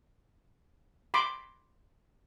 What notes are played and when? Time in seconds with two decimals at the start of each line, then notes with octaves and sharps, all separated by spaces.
1.14 B5 C6 D6